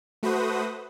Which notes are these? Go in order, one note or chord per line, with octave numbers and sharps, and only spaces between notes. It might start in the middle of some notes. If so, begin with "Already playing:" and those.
A3 F#4 B4 C5 D#6